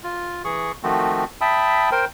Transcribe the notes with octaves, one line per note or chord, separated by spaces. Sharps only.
F4
E3 G#4 C#6
D#3 F3 A3 C4 F#4
E5 G5 A5 B5 D#6 E6
A#4 C5 G5